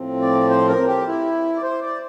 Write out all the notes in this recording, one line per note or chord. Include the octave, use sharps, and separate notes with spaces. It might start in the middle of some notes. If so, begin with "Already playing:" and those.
Already playing: A2 F3 C4
D5
C5
A#4
G4
E4
D5
C5
D5